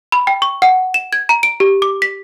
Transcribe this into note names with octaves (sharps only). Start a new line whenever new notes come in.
B5
G5
C#6
F#5
E7
G#6
A#5
D7
G4
D6
B6